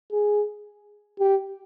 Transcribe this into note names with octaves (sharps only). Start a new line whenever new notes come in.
G#4
G4